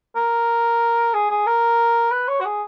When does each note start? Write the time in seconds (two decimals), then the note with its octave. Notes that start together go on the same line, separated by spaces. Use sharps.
0.16 A#4
1.14 G#4
1.30 G#4
1.47 A#4
2.11 B4
2.28 C#5
2.40 F#4
2.45 G#4